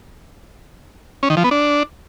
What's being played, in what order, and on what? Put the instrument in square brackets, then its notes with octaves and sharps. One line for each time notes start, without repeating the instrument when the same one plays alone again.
[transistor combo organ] C#4
D#3
F3
B3
D4